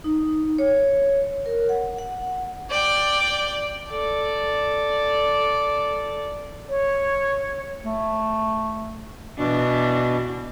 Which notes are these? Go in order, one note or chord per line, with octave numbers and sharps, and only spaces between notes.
D#4
C#5
A#4
F#5
F#5
D5 G5
A4 D5
C#5
A3
B2 E3 D4